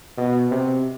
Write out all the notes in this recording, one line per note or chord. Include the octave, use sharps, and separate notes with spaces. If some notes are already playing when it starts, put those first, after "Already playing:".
B2
C3